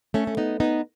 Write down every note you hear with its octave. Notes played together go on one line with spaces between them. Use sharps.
A3 C#4
C#4
B3 D#4
B3 D#4